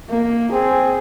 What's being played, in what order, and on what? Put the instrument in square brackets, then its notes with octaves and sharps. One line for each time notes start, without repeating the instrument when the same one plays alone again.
[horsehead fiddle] A#3
[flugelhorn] C4 [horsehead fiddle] G#4